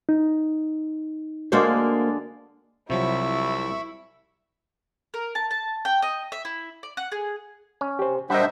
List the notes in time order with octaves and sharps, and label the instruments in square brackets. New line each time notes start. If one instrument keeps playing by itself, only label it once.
[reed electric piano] D#4
[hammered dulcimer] D3 G#3 D5 [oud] A#3 F#4 C5
[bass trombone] C2 [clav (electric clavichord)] C3 F3 F#3 [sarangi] E4 [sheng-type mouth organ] E5 B5 C#6
[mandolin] A#4
A5
A5
G5
D#5
E5
E4
D5
F#5
G#4
[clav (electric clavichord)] C#4
[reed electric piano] G4 C5
[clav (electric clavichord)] G3 A#4 [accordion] D4 C5 E5 [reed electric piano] D#5 F#5